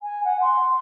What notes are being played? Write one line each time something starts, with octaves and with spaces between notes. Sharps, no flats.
G#5
F#5
C6